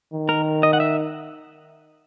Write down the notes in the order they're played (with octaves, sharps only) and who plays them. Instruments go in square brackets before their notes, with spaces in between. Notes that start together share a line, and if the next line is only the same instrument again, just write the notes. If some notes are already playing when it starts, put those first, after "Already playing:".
[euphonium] D#3
[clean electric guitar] A#4
D#5
F#5
E5